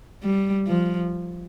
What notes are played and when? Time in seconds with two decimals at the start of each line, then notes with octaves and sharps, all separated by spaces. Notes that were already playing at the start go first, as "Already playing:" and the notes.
0.23 G3
0.67 F3